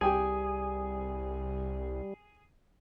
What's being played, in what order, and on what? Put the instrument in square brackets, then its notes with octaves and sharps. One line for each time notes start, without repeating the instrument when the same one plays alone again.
[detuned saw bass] C2 [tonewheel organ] G3 [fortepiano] G4 G5 G#5 [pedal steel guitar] G#4